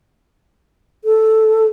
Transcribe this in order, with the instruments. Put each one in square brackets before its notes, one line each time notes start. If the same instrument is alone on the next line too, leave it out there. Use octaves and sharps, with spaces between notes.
[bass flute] A4